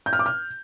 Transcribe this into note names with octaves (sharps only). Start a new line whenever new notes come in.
G6
F6
D6
F6